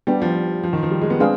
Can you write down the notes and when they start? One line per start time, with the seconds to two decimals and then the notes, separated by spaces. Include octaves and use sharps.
0.07 G3 B3 D4 G4
0.22 F3
0.64 F3
0.73 D#3
0.83 F3
0.91 G3
1.01 G#3
1.10 B3
1.20 G#3 C4 D4 G#4 B4 F5